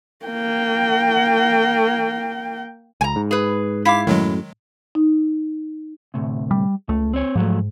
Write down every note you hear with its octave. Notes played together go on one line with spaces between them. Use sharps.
A#3 G5
C#2 G#5 A#5
G#2
G#4 B4
E4 F5 D6 B6
F#2 A2 D#3 F#3 G#3
D#4
D2 A2 C3
G3
C#2 A3
C4 C#5
G#2 F3 F#3 A3